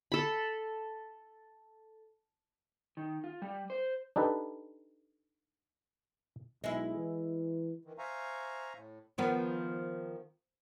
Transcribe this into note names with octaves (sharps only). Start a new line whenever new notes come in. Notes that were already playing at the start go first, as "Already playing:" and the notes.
A4 B5
D#3
F4
G3
C5
D4 D#4 G4 A4 B4
B1 G#3 E4
E3
D#3 E3
C5 E5 F5 G#5 A#5 C#6
A2
D#3 F3 B3